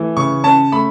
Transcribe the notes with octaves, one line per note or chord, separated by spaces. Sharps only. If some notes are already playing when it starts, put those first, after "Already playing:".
Already playing: E3 A3
C#3 C#6
C#4 A5
A3 B5